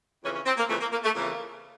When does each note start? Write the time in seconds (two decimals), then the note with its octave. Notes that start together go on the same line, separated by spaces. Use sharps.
0.23 F2 C#3 E3 C#4
0.35 C#4
0.46 C4
0.58 A#3
0.69 F2 C#3 E3 A3
0.81 A#3
0.92 A#3
1.04 A3
1.15 F2 C#3 E3 A#3